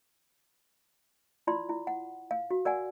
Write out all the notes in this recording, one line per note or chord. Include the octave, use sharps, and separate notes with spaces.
E4 F4 D5 B5 C6
E4
F#5
F5
F#4
A#4 D5 F#5 G#5